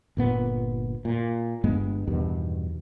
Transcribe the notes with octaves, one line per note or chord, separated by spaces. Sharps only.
G1 A#2 B3
A#2
G1 G2 G#3 B3
E2 G2 B2 D#3